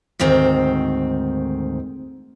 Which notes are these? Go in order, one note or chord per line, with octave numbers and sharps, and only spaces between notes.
D2 G#2 D#3 C4